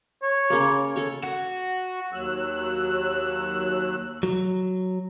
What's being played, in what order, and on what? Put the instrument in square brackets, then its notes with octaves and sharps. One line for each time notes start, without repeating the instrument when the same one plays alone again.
[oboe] C#5
[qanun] C#3 A#3
A4 C#5
[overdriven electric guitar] F#4
[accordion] D#2 F#3 E6 F#6
[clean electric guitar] F#3